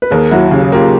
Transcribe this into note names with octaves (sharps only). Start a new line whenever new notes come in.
B4
D#2 G#4 A#4
F#3 E4 F#4
C#3 G4
G#4
A#3 F4 G4